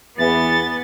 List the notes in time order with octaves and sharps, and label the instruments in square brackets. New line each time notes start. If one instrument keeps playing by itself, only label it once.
[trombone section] E2 E3 [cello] B3 [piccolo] A6